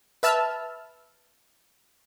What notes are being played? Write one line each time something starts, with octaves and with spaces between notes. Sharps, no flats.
B4 E5 A5 E6 F6